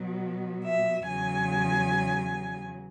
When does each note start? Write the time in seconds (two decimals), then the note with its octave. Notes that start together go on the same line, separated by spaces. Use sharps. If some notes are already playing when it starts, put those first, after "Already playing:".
Already playing: B2 F#3 B3
0.64 E5
1.06 E2 C#3 F#3 G#5